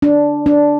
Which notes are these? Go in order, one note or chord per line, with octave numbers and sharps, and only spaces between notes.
D4
D4